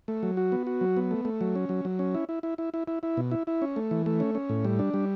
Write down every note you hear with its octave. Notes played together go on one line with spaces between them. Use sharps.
A3
F#3
F#4
B3
F#4
F#3
B3
A3
A3
F#3
C#4
F#3
F#3
C#4
E4
E4
E4
E4
E4
E4
E4
B2
E4
E4
C#4
A3
E3
A3
C#4
C#4
A2
G3
D4
G3